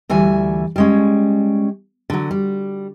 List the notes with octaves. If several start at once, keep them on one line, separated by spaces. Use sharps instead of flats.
D2 E3 G3 G#5
G3 G#3 C#4
D3 F#3
G3